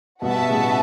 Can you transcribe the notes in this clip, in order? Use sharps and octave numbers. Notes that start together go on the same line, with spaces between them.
G2 B2 F#4 B4 E5 A5
A2 C#3